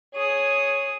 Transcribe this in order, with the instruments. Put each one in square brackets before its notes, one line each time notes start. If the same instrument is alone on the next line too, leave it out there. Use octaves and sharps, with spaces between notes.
[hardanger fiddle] G#4 D#6 [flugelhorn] C#5